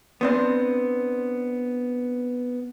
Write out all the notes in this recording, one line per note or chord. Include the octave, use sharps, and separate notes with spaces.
B3 C4 D4